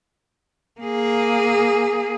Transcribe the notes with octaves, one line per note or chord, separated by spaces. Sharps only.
A#3 G#4